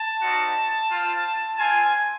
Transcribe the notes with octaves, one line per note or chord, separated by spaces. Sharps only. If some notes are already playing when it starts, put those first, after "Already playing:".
Already playing: A5
G3 C4 D#4 F#4
C4 F4
C4 F4 G#5